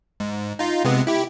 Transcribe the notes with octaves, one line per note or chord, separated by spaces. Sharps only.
G#2
D#4 F4
C3 G#3 B3
E4 G4